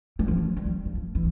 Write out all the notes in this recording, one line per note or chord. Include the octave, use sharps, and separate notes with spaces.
G3
F3
G3
F3
E3